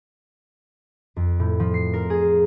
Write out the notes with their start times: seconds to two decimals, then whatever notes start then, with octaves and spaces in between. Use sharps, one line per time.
1.16 F2
1.40 A2
1.60 F3
1.74 C7
1.93 A#4
2.10 G#4